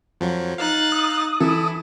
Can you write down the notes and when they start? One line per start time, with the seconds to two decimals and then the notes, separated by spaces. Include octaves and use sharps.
0.21 F2 F3 F#3
0.58 D#4 F5 F#6 A6
0.92 D#6
1.40 E3 E4 A4